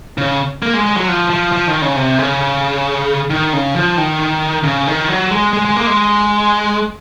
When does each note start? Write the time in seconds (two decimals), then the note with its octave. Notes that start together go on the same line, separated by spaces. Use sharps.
0.18 C#3
0.63 A#3
0.74 G#3
0.86 G#3
0.97 F#3
1.08 F3
1.30 F3
1.53 F3
1.68 D#3
1.82 C#3
1.96 C3
2.19 C#3
3.30 D#3
3.53 C#3
3.76 F3
3.98 D#3
4.64 C#3
4.87 D#3
5.08 F#3
5.31 G#3
5.53 G#3
5.65 G#3
5.76 A#3
5.87 G#3